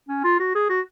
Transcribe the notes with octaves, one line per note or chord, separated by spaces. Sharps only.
C#4
F4
F#4
G#4
F#4